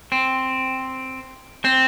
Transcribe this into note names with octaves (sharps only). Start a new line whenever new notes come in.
C4
C4